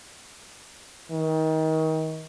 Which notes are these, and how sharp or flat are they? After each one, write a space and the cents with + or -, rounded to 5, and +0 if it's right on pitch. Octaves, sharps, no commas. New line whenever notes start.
D#3 +30